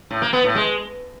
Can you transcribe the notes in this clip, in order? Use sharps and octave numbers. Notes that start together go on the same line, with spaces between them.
A2
A#3
B3
A2
G#3